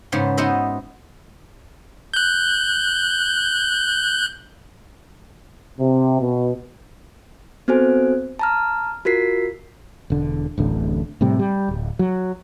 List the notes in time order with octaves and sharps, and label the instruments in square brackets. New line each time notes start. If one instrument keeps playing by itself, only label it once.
[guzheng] G#2 C#3 B3 C5
B3 D#4 F#4 C5 D#5 E5
[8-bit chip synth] F#6 G6
[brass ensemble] C3
B2
[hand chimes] B3 C4 F#4 A4 C5 G#5
A5 A#5 F6
F4 F#4 A#4 B6 C7
[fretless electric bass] E1 D3
D1 A1 D3
A2 C3 G3
G3
D1
F#3